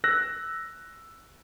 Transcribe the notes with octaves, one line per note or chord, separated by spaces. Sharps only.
E6 F#6 A#6